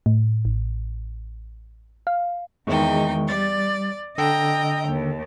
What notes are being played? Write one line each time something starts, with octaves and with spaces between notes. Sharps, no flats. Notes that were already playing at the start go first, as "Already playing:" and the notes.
A2
A1
F5
E2 D#3 G#3 D#4 G5 C#6
G3 D5 A6
D3 A4 D#5 G5 A#5 E6
D#2